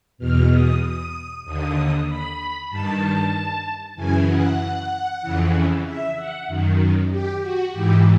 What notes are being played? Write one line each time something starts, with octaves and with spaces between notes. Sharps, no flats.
E2 B2 F6
D#6
D#6
D#2 D3 D#6
B5
G2 D#3 A5
F#2 C#3 E3 G#5
F#5
F2 C#3 E3
E5
F#5
F#2 D#3
G4
F#4
G#2 E3 G4